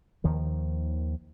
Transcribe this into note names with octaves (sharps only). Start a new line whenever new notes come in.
D#2 D#3 F3